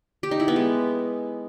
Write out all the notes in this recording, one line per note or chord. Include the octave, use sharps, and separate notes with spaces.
G4
D#4
E4
B3
G#3